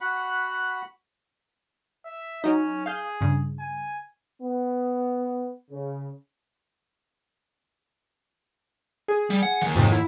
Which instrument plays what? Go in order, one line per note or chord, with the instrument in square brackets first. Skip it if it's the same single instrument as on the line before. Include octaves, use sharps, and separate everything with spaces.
[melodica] F#4 F#5 B5
[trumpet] E5
[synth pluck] F#3 D#4 [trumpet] C#4
[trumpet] G#4 [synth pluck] F5 G6
[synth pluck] G2 C#3
[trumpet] G#5
[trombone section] B3
C#3
[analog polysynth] G#4
[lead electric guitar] G3
F#5
D#2 E3
[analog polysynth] F2 G#2 C3
E4